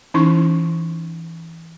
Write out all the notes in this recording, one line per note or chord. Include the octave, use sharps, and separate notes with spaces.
E3 C#4 D#4 E4 C6 C#6